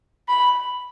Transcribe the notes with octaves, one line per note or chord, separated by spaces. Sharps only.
B5